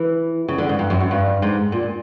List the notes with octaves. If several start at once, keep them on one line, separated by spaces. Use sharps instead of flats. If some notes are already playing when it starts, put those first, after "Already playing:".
Already playing: E3
C#3
D3
G#2
G2
F#2
F#2
G2
G#2
A#2